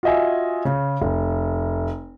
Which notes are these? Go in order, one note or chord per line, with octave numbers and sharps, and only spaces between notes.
F4 F#4 D#5 E5 G#5
C#3
F1